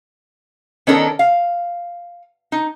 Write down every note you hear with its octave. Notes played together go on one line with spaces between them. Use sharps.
D#3 B3 C#4 D4 A4 A#4
F5
D#4